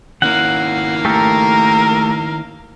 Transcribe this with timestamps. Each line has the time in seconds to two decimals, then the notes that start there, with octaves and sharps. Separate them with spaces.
0.22 D#3 A#3 C#4 E4 F5 F#5
1.05 A3 G4 A4 A#4